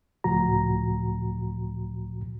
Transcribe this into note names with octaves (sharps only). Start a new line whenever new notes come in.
C#2 A2 F3 F#4 A#5